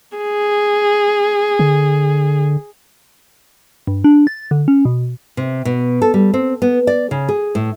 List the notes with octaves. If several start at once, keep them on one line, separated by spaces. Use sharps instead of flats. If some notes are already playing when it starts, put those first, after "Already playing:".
G#4
D3
G2
D4
A6
D3
C#4
B2
C3
B2
A4
G3
C4
B3
D5
C#3
G#4
A2